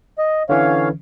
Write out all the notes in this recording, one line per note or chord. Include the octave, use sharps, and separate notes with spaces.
D#5
D3 E3 C#4 C#5 F5